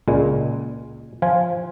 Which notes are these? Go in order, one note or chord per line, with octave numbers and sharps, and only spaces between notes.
C#2 A#2 G#3
F3 F4 G#5